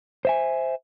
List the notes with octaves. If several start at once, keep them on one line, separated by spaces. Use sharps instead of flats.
C5 E5 G#5